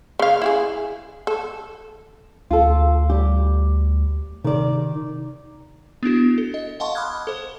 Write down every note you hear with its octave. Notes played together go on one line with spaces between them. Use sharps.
C#3 F5
E4 F#4 G#4
A4
D2 F4 A4
G3 G4
C3 D#3 D5
B3 D4 E4 F#4
A4
D#5
D#5 F5 F#5 A5 C6 C#6
B5 D6 D#6 F6 F#6 G#6
A4 C5